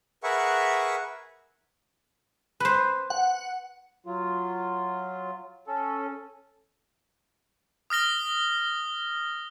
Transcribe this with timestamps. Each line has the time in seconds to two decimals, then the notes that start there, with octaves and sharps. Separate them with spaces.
0.23 G#4 A#4 B4 E5 F#5 C#6
2.60 B4 C5
3.10 F#5
4.06 F#3 F4
5.68 C#4 A4
7.90 D#6 F6 A#6 G7